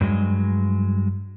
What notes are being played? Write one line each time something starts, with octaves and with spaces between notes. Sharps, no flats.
G2 F#3 G#3